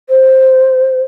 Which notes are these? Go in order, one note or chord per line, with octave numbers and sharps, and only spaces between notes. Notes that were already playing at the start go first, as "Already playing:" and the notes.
C5